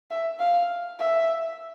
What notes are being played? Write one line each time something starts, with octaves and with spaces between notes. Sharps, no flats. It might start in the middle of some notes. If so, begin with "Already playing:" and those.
E5
F5
E5